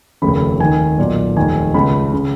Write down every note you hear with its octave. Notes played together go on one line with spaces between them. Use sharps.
F1 D#2 C#3 B5
D#2 D#3 G#5
B1 A#2
F1 D#2 D#3 G#5
C#2 C#3 B5
C#3